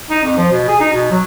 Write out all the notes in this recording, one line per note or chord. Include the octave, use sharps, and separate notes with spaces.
D#4
F2
F3
B2
G#4
D#4
B2
F#3